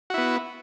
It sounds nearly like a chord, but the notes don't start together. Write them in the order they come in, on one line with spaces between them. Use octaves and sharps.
F#4 E4 B3